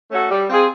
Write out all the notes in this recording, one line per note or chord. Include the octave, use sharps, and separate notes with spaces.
A3 C#4 F#4 A4
G3
C4 F4 G#4